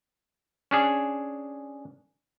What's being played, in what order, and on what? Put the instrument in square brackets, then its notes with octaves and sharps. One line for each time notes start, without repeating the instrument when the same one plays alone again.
[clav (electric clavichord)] C#4 D4 G#4